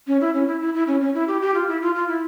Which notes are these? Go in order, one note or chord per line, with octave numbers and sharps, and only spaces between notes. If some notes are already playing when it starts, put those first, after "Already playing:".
C#4
E4
C#4
E4
E4
E4
C#4
C#4
E4
G4
G4
F4
E4
F4
F4
E4